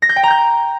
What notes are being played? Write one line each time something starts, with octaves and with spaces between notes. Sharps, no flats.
A#6
G6
G5
A#5
G6